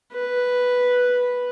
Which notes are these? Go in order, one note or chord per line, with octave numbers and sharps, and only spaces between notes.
B4